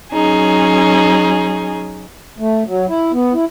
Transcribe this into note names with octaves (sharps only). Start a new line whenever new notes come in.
F#3 C#4 D#4 G#4
A3
F#3
E4
B3
E4